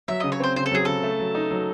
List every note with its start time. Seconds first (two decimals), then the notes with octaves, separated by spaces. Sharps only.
0.08 F#3 E5
0.20 C#3 D#5
0.32 C#5
0.40 C4 C5
0.56 C#3 C5
0.66 A4
0.72 F#3 G#4
0.85 C#3 A4
1.03 A3
1.19 F#3
1.35 D#4
1.51 F#3